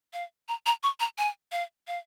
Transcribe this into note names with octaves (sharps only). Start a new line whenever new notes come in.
F5
A#5
A#5
C#6
A#5
G#5
F5
F5